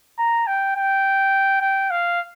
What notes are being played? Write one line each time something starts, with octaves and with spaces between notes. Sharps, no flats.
A#5
G5
G5
G5
F5